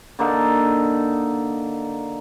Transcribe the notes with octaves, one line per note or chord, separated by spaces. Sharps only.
D3 A#3 D#4 A4